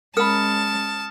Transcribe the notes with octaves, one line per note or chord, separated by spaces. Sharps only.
G#3 C#4 A#4 A5 B5 D#6 F6 C#7